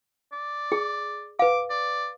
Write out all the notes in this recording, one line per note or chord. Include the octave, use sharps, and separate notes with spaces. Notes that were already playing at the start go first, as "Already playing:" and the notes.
D5
G#4
B4 F5 D6
D5